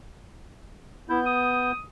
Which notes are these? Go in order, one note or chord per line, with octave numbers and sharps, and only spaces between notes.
B3 E4 G6
D#6